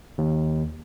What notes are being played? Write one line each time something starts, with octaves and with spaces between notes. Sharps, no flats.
D#2